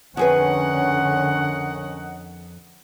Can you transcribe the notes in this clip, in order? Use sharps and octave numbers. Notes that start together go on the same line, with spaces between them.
F2 D3 C#4 G#4 A#4 B4 D#5 F#5